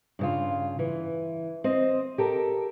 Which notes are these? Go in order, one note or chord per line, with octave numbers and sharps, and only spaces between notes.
G2 C#3 F4
E3
C4 C5 D#5
G4 A4 A#4